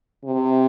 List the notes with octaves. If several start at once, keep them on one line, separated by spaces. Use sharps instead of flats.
C3